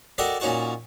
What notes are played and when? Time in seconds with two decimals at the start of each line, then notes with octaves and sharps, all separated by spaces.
0.18 F#4 G4 A4 A#4 D5 D#5
0.40 A#2 C#4 D#4 F#4 A5